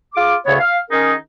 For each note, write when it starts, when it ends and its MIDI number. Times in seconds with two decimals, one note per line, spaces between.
0.15 0.35 65
0.15 0.35 68
0.15 0.35 86
0.46 0.55 38
0.46 0.55 49
0.46 0.55 59
0.46 0.55 73
0.60 0.79 77
0.91 1.13 51
0.91 1.13 61
0.91 1.13 63
0.91 1.13 68
0.91 1.13 70